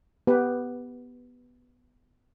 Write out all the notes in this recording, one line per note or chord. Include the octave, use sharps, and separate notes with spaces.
B3 G4 B4